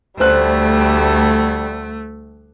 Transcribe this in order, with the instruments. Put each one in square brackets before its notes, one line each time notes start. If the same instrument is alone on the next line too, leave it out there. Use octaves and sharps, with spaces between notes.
[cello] D2 [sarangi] G3 [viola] A3 [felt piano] C5 F#6